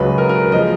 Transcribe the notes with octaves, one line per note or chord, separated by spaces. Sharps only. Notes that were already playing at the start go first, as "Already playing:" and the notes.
Already playing: C#2 C#3 F#3 B4
A#4
A#4
F3 G#3 D#5